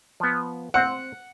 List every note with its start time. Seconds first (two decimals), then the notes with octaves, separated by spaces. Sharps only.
0.20 F3 B3
0.74 C4 C5 F#5